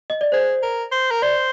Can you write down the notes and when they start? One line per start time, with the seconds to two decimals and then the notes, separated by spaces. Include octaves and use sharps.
0.10 D#5
0.21 D5
0.32 G#4 C5
0.63 A#4
0.92 C5
1.11 A#4
1.22 C5 D5